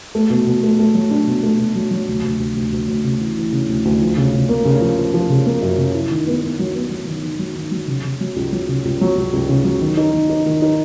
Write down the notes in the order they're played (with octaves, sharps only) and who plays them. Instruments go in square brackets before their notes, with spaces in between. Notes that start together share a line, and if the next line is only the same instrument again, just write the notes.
[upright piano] A3
B2
B2
A3
A3
F#3
D4
B2
A3
B2
F#3
F#3
D2
D2
D2
D2
D2
D2
C#3
E3
E3
C#3
D2
D2
F3
C#3
C#3
A#3
C#3
F3
F3
F3
C#3
A#3
F#2
C#3
E4
D#3
B3
B3
F#3
B3
F#3
D#3
D#3
F#3
D#3
F#3
C#3
C#3
F#3
C#2
F#3
C#3
C#2
F#3
C#2
C#2
C#3
F#3
D#3
D#4
D#3
D#4
D#3
D#4